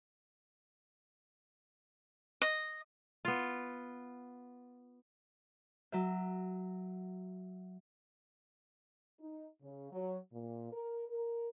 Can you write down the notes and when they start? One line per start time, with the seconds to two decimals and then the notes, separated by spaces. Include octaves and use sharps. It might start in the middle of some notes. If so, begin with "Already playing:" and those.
2.42 D#5
3.25 B3 F4
5.92 F#3 E5
9.20 D#4
9.62 C#3
9.92 F#3
10.33 A#2
10.72 A#4
11.08 A#4